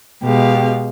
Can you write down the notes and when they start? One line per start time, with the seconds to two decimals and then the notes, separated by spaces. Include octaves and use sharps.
0.23 B2 G#3 G4 F5